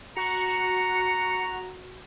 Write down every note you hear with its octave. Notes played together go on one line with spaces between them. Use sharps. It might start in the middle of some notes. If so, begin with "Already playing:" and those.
F#4 A#5 C#7